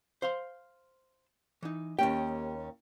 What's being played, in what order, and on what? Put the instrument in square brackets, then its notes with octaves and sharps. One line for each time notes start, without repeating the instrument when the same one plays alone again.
[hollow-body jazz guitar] C5 F5 C6
E3 D#4
[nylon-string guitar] D#2 C#4 G5 [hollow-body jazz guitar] A#3 G4